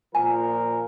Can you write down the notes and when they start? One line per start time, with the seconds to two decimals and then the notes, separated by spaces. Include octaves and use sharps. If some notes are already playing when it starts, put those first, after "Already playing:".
0.15 A#2 F3 A#4 G#5